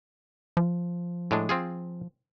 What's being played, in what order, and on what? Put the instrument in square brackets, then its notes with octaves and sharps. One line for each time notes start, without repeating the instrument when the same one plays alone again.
[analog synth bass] F3
[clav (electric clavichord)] A2 G#3 D4
C4 F4 G#4